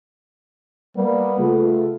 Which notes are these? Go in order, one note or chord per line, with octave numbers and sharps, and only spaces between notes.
G3 A#3 B3
C#3 A3 F4